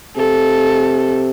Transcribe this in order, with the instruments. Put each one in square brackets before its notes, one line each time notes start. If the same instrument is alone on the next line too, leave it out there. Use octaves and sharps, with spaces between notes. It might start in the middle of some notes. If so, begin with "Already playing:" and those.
[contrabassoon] C3 [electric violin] A4